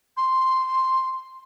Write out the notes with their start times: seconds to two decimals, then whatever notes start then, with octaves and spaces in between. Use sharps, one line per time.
0.17 C6